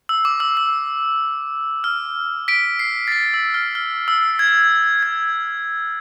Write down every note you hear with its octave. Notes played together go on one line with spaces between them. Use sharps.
E6
D6
E6
E6
F6
B6 D7
C7
A6
B6
E6
F6
F6
E6
G#6
G#6